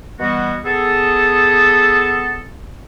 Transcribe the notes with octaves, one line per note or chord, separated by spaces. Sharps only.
B2 E3 G3 B3 F#4
B3 G#4 A4